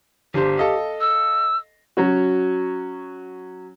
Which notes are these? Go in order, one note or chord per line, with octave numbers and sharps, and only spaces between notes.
G1 D4 G4 C5
A4 D#5 F5
E6
F#3 C#4 F#4